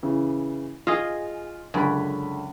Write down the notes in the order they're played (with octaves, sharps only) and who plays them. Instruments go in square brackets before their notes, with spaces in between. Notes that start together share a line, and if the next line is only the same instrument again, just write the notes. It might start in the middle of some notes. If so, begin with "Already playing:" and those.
[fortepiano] C#3 E3
[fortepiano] F4 [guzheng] G#4 D#5 F5
[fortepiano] C#2 D3 B5 [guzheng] F#2